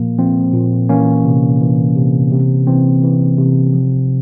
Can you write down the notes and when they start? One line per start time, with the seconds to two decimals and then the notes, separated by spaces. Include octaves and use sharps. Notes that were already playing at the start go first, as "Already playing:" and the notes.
Already playing: A#2 F3 A#3
0.19 F3 C4
0.54 A#2
0.89 E3 A#3 C#4
1.25 C3
1.61 E3
1.96 C3
2.32 C3
2.67 E3 C4
3.03 E3
3.38 C3
3.74 F3